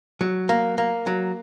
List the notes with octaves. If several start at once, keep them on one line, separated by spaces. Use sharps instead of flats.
F#3
A#3
A#3
F#3